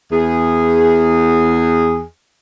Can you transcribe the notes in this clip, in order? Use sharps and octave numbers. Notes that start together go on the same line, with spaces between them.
E2 G#4